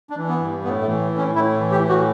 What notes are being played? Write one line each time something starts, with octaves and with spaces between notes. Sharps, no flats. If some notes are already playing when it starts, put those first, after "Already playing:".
D4
E3
B3
G2
A2 B3
A3
E3
A2
C#4
A2 E4
E3
G4
A2
F#4